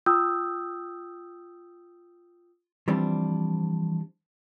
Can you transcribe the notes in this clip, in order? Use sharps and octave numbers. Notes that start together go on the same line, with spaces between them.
F4 G5 D#6 E6 G6
E3 F3 G3 C4 D4